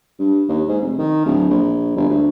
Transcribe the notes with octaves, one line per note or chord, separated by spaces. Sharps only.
G2
D#2
G#2
F1
D#3
D1
A#1
G1
D2